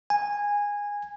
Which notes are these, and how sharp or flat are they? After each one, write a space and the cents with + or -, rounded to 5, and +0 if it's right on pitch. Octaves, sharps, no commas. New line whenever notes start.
G#5 -15